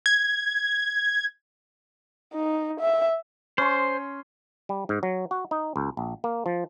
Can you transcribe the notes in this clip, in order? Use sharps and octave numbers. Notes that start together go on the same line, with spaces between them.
G#6
D#4
E5
C#4 C5 C6
G3
G#2
F#3
F#4
D#4
C#2
A#1
A#3
F3